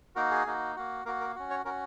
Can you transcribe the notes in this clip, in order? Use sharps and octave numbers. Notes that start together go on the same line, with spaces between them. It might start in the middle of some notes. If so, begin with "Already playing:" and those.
A#3 D#4 F#4 A#4
G#4
A#3 D#4 F#4
A#3 F#4
A#3 F#4 A#4
A#4
C#4 F#4
C#5
C#4 F#4 A#4